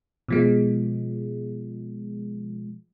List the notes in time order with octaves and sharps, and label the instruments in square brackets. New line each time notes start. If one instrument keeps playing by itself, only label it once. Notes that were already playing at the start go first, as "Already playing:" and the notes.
[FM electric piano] B2 F3 G#3